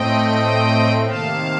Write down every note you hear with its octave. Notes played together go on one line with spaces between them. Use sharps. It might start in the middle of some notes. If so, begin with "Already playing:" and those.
Already playing: A2 A3 C4 D#5 G5
C3 D#3 A#3 F5 A5